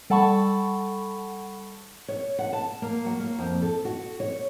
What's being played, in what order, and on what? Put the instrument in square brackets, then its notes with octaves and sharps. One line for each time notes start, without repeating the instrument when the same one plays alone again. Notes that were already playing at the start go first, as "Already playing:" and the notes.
[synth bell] G3 A4 F#5 A5 B5 C#6
[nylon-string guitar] C#5
F#5
A5
A#3
F#3
A#3
F2
A4
F#4
C#5